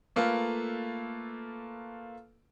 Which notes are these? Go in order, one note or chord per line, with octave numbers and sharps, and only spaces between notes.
A3 A#3 F4 A4 B4